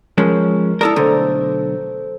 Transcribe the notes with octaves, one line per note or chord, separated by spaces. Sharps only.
F3 G#3 C#4 A#4
E4 A4 A#4 D5 A#5 D#6
B1 D3 A3 A4 C5